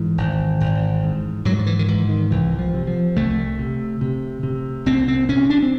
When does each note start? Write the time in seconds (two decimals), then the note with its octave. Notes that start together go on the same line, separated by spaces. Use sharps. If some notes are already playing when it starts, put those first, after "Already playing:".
Already playing: G#2 E3
0.18 G#1
0.61 G#1
1.03 G#2
1.45 G#2 F#3
1.59 F3
1.66 E3
1.79 D#3
1.88 G#2 E3
2.09 D#3
2.31 C2 E3
2.59 F3
2.74 C3
2.87 F3
3.16 C2 A3
3.59 C3
4.01 C3
4.43 C3
4.86 C2 C4
5.08 C4
5.29 C3 C#4
5.50 D4
5.62 C4